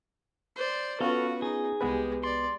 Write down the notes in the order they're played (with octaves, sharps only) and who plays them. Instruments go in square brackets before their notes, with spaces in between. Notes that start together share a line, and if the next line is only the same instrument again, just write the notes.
[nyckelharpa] C5 D5
[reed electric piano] B3 C#4 F4 [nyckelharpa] F#4 B4 [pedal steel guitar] A4 F5
[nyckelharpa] D#4 [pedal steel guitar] G#4
[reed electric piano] C2 B3 B4 [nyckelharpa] G#3 G4
[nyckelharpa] D5 [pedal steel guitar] C6